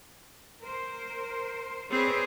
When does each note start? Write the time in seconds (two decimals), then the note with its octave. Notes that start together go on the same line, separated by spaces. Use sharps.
0.61 A#4 C5
1.91 C4 G#4 B4 C#5 D5